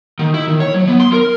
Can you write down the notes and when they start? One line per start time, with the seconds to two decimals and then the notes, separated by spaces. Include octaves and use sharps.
0.19 D#3
0.34 E4
0.47 D#3
0.60 C#5
0.74 F#3
0.88 B3
1.00 C6
1.13 A#4